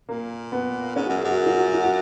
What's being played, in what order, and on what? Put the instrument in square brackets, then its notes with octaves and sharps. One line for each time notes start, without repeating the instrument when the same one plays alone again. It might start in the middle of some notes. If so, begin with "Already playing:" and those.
[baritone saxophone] A#2 [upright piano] A#3
[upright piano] B3
[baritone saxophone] G#2 [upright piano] C#4
[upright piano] F#4
[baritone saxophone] F#2
[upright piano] G#4
[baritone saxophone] F#2 [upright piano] F#4
[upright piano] G#4
F4
F#4
F4
F#4